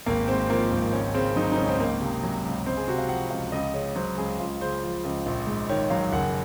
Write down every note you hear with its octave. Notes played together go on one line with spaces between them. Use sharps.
G#1 A#3
G#2 C4
F3 A#3
G#1
C#2 C#4
C#3 C4
F#3 D#4
D#4
C#2 C#4
C4
C#2 A#3
C3
F#3
C#2
C#2 C4
G#4
C3 F#4
F5
F3 F#5
C#2 F5
C#2 D#5
C#3 C#5
F#3 C5
C#2 G#4
C#2 F4
C#3 C5
F3
C#2
A#1
G#2
D#3 C#5
F#3 F5
F#1 F#5